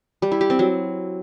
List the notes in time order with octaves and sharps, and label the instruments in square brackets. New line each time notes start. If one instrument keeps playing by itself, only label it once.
[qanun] G3
E4
G4
C4
F#3